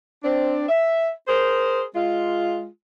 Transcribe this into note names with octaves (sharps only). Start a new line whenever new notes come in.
C4 D4
E5
G#4 A#4 C5
G#3 F4